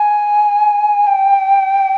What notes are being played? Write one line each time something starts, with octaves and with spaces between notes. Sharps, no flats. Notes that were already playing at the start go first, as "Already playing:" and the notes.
Already playing: G#5
G5